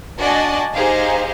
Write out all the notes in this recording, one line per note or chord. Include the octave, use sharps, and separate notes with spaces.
D4 F#4 D5 D#5 G#5 A5
D#4 G4 G#4 C5 F5